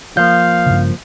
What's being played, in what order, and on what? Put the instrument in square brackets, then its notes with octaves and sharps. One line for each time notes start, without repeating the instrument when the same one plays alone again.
[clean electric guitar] F3 A#3 [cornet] F5 [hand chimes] G6
[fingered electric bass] G2 C#3